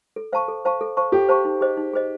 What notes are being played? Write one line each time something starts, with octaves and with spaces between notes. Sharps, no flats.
A4
C5 F5 A5 C#6
A4
C5 F5 A5 C#6
A4
C5 F5 A5 C#6
G4 A4
C5 F5 A5 C#6
D#4
G#4 C5 D#5
D#4
G#4 C5 D#5